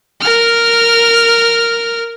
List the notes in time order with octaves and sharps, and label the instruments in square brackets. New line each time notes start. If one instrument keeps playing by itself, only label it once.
[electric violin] A#4 F6